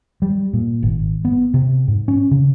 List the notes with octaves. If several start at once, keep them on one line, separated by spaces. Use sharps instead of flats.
G3
A#2
G#1
B3
C3
G#2
C#4
C#3